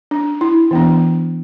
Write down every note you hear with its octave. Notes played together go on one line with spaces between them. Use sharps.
D4
E4
E3 B3 D4